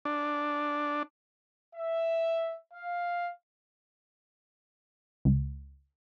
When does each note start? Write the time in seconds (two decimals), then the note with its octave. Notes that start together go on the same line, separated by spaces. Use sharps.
0.05 D4
1.74 E5
2.73 F5
5.25 C#2